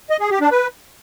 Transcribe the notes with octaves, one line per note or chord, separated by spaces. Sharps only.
D#5
G#4
G4
D4
B4